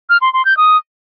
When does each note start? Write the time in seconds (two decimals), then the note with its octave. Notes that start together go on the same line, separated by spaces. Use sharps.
0.10 F6
0.21 C6
0.33 C6
0.45 G6
0.57 D#6